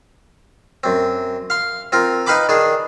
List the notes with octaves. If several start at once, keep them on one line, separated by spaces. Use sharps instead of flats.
F#2 C4
F5 C6
C4 F4 A#4
D#4 B4 F5 G5 B5 D6
D#3 D4 G#4